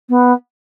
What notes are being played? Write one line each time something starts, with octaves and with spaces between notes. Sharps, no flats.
B3